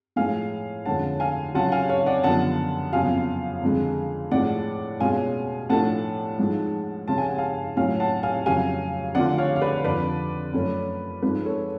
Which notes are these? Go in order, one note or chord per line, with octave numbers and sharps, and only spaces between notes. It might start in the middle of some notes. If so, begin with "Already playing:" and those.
A2 F3 G#3 F5 G#5
F2 D3 G#3 C#4 F#5 A5
F5 G#5
C#3 F#3 C#4 F4 F#5 A5
F5 G#5
C#5 F5
D5 F#5
F#2 D3 F3 B3 F#5 A5
F2 C#3 F#3 B3 F4 F5 G#5
F2 D3 G#3
A2 F3 G#3 D5 F#5
B2 G#3 C#4 F4 F5 G#5
A2 F3 A3 D4 F#5 A5
G#2 F3 G#3
C#3 F3 G#3 C#4 F4 A5
G#5
F#5
F5 G#5
A2 F#3 C#4 F4 F5 G#5
F#5 A5
F5 G#5
F2 C#3 F#3 F5 G#5
D3 F3 A3 F4 D5 F#5
C#5 F5
F5
B4 D5
F2 D3 F3 B4 D5
F#2 F3 A3 C#4
G#2 F3 G#3 B4
A4 C#5